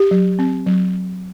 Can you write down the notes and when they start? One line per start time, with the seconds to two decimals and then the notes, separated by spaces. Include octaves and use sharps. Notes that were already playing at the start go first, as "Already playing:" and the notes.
Already playing: G4
0.11 F#3
0.39 C4
0.66 F#3